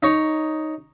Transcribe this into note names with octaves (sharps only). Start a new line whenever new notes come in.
D#4 C#5